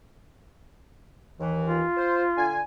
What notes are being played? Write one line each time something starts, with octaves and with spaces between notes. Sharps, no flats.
D#2 E3
F4
C5
D3 G#5